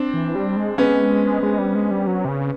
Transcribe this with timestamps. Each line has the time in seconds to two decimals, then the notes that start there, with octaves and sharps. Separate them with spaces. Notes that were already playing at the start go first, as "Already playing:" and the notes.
Already playing: C4 D4
0.13 E3
0.35 G3
0.56 G#3
0.78 G#3 B3 C#4
1.43 G#3
1.59 G3
1.75 G#3
1.91 G3
2.07 F#3
2.25 C3
2.28 C#3